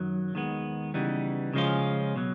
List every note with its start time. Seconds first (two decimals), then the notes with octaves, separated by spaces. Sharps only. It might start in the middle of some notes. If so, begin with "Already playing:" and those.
Already playing: F#2 D#3 F#3
0.34 D#2 D#3 G#3 B3
0.94 C#3 E3 G3 B3 D#4
1.54 C#3 F3 G#3 C#4 F4
2.16 B2 F#3